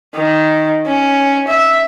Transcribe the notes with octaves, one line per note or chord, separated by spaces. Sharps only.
D#3
C#4
E5